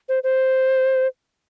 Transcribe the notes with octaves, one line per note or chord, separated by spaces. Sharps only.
C5
C5